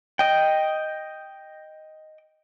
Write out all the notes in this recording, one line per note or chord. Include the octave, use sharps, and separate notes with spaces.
D#5 G5